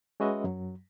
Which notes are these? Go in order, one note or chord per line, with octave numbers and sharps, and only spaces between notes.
G#3 C#4 F#4 B4 D#5 E5
F#2 F#3